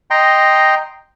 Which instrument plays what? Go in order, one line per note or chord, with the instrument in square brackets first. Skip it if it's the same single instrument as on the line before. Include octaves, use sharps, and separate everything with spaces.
[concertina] D#5 G5 A#5 C6